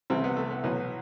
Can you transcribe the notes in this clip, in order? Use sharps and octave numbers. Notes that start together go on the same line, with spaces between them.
C2 C3 E3 C4
B3
A3
B3
B1 A2 E3 B3